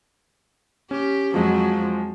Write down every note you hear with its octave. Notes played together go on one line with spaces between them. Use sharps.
C#4 G4
F2 F3 F#3 G#3